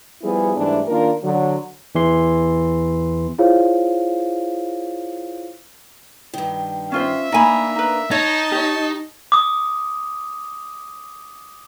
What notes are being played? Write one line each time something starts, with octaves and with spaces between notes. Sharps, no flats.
F3 G3 B3 E4 G#4
G#2 E3 G3 A3 D4 E4
D#3 A#3 D4 F4 A#4
D3 F#3
E2 E3 C6
E4 F4 G#4 C5 C#5 F5
G2 D#3
C#4 F4 C5 E5
A#3 D4 D#4 G#5 B5
D#4 B4
D#4 C#5 D#5 A5
G4 C#5
D6 D#6